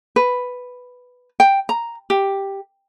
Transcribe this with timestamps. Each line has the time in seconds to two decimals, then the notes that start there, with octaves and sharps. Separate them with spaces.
0.16 B4
1.40 G5
1.69 A#5
2.10 G4